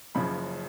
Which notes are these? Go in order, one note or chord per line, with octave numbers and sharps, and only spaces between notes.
F#1 F#2 C#3 F3 B5